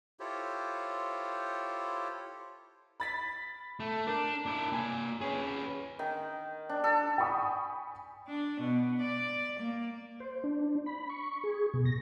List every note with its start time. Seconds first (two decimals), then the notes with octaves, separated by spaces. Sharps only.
0.20 E4 F4 G4 A4 C5 C#5
3.00 B5 A6 B6
3.80 A3
4.07 D4 A#4
4.46 D4 E4
4.72 A#3 G#5
5.21 C#4 G#4 B4
5.99 D#3
6.70 D4
6.84 A4
7.18 G5 G#5 B5 C#6 D#6
8.27 D4
8.61 B2
9.01 D5
9.59 A#3
10.20 C5
10.44 D4
10.86 B5
11.10 C#6
11.44 G#4
11.74 B2
11.85 A#6